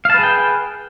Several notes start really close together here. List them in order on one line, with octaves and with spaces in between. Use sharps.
F5 A5 B4 G#4 G5